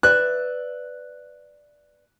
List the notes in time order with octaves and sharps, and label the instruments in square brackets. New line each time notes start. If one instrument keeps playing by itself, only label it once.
[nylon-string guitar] B4 D5 E5 [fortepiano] F#6